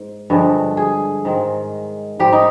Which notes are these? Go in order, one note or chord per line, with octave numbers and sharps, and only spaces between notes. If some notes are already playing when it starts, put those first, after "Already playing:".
Already playing: G#2
G2 D3 F3 G#3
G#4
G#2 D#3 G#3
G#2 G3 G4
D#4